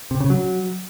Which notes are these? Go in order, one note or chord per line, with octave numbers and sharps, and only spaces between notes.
C3
C#3
F#3